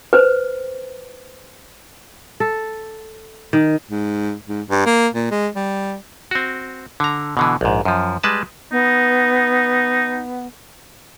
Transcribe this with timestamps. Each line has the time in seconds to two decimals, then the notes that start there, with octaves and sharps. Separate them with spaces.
0.13 B4 C5
2.40 A4
3.53 D#3
3.90 G#2
4.48 G#2
4.70 G2
4.86 A#3
5.14 A#2
5.31 G#3
5.56 G3
6.31 C4 F#4
7.00 D3 A#5
7.37 B2 D3 E3
7.61 A#1 G#2
7.85 F#2 F3
8.23 G3 G#3 B4 A5
8.72 B3 D#4